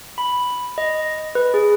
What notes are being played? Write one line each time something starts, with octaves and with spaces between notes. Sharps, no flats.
B5
D#5
B4
G#4